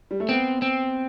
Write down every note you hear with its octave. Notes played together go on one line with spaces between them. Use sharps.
G3
A3
B3 C4
C4